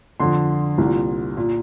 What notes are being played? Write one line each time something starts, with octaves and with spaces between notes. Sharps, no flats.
F2 D3 C6
C2 A#2
A#2